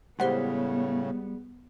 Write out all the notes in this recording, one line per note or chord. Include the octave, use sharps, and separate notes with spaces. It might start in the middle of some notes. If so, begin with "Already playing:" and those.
A2 C#3 G3 G#3 B3 G4 C5 F#5